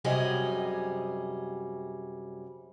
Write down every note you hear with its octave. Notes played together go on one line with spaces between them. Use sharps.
F#2 C3 F#3 G3 G#4 D#5